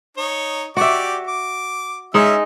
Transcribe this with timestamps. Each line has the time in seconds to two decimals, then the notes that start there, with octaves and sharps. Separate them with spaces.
0.17 D#4 C#5
0.77 F#4 G4 D5 E5 D6
1.27 D6
2.14 G#3 C#4 D#4 E5 E6